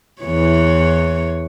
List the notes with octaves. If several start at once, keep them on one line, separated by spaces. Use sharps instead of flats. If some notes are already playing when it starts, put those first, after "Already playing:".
E2 E3 C#5